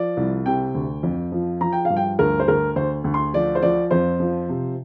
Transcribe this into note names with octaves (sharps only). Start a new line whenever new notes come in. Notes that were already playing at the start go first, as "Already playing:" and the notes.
Already playing: F3 D5
C2
C3 G5
D2
F2
F3
F3 A#5
G5
G2 F5
G5
D2 A#4
C5
D2 A#4
D2 C5
D2
C6
F3 D5
C5
F3 D5
F2 C5
F3
C3